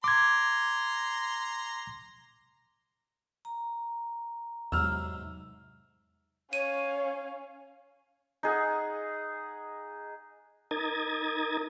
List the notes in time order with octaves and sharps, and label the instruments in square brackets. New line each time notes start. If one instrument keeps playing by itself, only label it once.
[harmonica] A#5 C6 [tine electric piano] D6 G#6
[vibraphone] A#5
[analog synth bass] E2 [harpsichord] G#2 C3 F#3 [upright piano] E6 F6
[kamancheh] C#4 F5 [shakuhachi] C#5 [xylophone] D#7
[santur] D#4 G#4 F#5
[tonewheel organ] D#4 A#4 A#5 D#6 G#6 A6